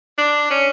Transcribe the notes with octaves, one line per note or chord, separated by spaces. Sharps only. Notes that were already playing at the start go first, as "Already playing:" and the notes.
D4
C#4